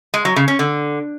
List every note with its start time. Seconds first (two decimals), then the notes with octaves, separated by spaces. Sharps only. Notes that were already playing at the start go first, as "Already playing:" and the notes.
0.14 G#3
0.25 F#3
0.36 C#3
0.48 C#4
0.59 D3